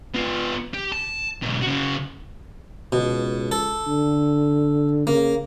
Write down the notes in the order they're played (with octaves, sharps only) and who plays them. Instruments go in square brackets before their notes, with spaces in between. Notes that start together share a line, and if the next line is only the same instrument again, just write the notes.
[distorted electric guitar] B3 F4
G4
A5
G#2 B2
C#3 F#4
[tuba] C#2 [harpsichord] B2
[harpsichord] A4
[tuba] D3
[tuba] C#3 [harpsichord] A#3